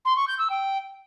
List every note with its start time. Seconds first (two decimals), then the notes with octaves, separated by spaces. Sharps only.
0.05 C6
0.16 C#6
0.28 G6
0.39 E6
0.50 G5